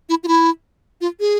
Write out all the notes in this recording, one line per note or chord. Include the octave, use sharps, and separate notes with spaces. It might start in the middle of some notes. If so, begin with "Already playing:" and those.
E4
F4
E4
F4
G#4